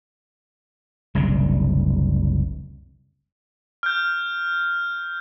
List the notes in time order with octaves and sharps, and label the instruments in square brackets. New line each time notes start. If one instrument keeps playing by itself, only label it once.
[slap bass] F#1 C2 D3
[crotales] F6 G6